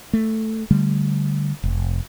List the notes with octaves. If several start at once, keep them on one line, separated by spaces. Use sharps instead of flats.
A3
D3 G3 A3
F1